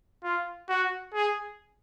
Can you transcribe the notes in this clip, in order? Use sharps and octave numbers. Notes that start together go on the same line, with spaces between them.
F4
F#4
G#4